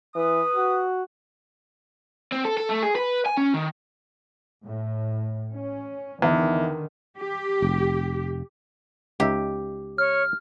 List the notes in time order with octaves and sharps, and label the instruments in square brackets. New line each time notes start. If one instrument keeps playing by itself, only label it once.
[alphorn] E3 [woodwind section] B4 D#6
[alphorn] F#4
[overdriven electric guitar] C4
A4
A4
A3
G#4
B4
G#5
C#4
D#3
[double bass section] A2
C#4
[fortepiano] E2 [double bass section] D3 D#3
[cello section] G4
[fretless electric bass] F1
[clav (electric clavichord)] C#2 D#4 E5 [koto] G4
[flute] C#5 [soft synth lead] F6